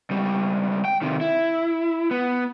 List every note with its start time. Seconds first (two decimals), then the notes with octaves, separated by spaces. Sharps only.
0.10 C#2 G3
0.85 G5
1.02 C3 D#3
1.21 E4
2.11 B3